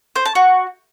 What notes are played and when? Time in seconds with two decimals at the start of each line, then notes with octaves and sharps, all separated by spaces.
0.16 C5
0.25 A5
0.35 F#4